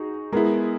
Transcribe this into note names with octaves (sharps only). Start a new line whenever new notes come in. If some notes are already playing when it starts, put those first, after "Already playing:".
Already playing: D#4 F#4 G#4
G#3 B3 E4 G#4 A#4